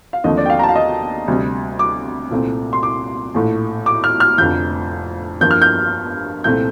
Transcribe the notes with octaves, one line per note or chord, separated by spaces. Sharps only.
F5
D#2 D3 F3 A3 C4 D#5
D5
G5
F5
A#5
A5
F5
D#5
D2 C3 G3
D6
C2 A#2 A3 C4
C6
D6
A#1 A2 A3
D6
F6
F6
F1 F2 D3 F3 G6
G2 F3 A#3 G6
F6
G6
C2 A#2 A3 C4 G6